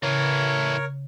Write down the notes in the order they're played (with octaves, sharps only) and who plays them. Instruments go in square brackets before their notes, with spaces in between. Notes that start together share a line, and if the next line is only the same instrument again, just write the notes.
[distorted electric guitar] A2 E3 [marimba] C#3 [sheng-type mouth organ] A#4 C#5